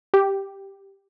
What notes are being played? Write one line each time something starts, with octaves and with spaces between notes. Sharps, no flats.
G4